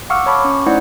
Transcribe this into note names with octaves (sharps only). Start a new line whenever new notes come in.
F5 F#5 C#6 D6 E6 F6
C#5 A5 B5 C#6 D6
C#4
A3 D#4 E4 C5 D5 F#5